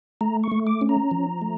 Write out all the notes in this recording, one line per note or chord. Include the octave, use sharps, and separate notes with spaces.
A3 A#5
C#6
A3
D6
C#4
A#5
F3
A3